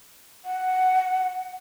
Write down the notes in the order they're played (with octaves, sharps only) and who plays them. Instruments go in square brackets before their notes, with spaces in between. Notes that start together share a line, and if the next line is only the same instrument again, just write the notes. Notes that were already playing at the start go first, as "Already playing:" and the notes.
[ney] F#5